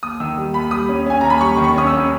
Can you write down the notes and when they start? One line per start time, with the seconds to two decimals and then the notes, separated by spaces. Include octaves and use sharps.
0.03 D#2 D#6
0.20 D#3 E6
0.37 G3
0.54 D#2 B5
0.71 G3 D#6
0.89 C#4
1.06 C#4 G#5
1.21 D#2 A#5
1.30 B5
1.40 G3 C#6
1.57 D#3
1.64 C#6
1.75 C#4 D#6
1.87 E6
1.92 C#4